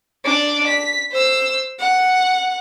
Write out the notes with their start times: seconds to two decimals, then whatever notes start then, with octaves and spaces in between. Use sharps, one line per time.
0.24 D4 D5
0.68 B6
1.12 C5 E6
1.79 F#5